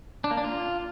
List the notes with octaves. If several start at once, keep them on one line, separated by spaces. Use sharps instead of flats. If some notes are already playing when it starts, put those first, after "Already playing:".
D4
A#3
D4
F4